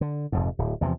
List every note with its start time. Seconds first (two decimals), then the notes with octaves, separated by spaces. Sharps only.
0.01 D3
0.32 F1 F2 G#2
0.59 D1
0.81 E2 C3 D#3 F3